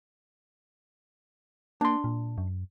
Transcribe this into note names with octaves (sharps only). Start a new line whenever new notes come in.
A#3 D4 C6
A#2
F#2